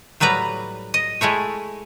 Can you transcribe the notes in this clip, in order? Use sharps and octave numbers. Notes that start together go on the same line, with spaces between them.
A2 F#3 G3 B4 A#5
D#5
G#3 A3 E4 C#5